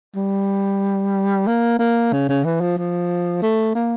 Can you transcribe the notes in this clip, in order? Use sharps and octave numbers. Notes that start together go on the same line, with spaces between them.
G3
A#3
A#3
C#3
C#3
E3
F3
F3
A3
A#3